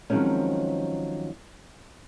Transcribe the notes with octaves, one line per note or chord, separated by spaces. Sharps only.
D#3 F3 F#3 G#3 C4 C#4